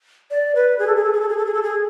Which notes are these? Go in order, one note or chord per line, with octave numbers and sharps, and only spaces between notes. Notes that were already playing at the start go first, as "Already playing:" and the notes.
D5
B4
G#4
A4
G#4
A4
G#4
A4
G#4
A4
G#4
A4
G#4